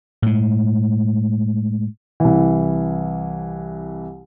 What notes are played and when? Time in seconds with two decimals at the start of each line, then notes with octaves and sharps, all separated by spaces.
0.22 A2 G#3
2.20 C2 E3